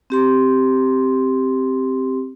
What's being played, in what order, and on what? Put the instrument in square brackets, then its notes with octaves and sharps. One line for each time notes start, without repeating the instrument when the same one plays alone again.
[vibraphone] C4 G4 C6